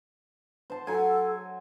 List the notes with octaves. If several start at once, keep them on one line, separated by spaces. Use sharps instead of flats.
C5 A5
F#3 A4 G#5